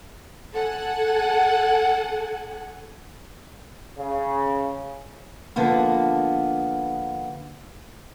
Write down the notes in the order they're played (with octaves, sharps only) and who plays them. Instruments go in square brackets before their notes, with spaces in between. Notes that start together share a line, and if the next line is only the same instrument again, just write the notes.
[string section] A4 F#5 G#5
[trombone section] C#3
[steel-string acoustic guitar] D3 F3 A#3 B3